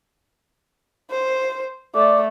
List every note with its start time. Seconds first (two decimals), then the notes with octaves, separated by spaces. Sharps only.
1.10 C5
1.95 A3 D5